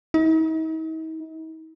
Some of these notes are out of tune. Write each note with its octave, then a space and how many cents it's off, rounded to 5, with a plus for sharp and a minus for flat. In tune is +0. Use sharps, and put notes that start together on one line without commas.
D#4 +45